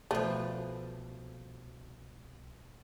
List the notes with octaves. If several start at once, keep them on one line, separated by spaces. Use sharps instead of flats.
C2 B2 F3 A3